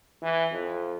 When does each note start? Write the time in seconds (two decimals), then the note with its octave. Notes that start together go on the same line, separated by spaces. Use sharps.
0.22 E3
0.52 F2